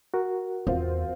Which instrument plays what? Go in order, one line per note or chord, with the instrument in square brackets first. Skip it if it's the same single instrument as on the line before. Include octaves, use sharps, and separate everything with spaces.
[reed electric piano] F#4 A#4
[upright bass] E2 [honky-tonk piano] C4 F4